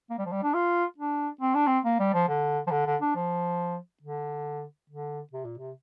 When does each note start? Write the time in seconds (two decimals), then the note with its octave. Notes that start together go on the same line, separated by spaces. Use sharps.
0.10 A#3
0.18 G3
0.25 F3
0.32 G3
0.43 D4
0.54 F4
0.98 D4
1.41 C4
1.55 D4
1.67 C4
1.85 A#3
2.00 G3
2.14 F3
2.28 D3
2.67 F3
2.71 D3
2.86 D3
3.01 D4
3.15 F3
4.03 D3
4.90 D3
5.33 C3
5.45 A#2
5.58 C3